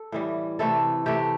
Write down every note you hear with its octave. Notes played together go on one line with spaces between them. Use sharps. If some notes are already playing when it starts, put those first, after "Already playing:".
Already playing: A4
A2 E3 G3
C3 E3 A3 A4
C3 E3 A3 G4